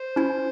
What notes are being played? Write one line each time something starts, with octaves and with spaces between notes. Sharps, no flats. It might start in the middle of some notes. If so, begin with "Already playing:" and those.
Already playing: C5
C#4 E4